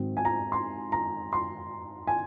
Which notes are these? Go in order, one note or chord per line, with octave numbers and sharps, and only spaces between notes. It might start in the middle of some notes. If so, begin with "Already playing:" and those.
Already playing: G#2 D#3 F#3 C4
G#5
A#5
C6
A#5
C6
G#5